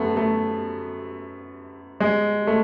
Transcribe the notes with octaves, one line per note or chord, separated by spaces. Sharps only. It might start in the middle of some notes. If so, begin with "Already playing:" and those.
Already playing: F#2 A3 B3
A3
G#3
A3